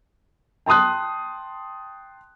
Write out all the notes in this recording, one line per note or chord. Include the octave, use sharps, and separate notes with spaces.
G5 A5 C6 D#6 F#6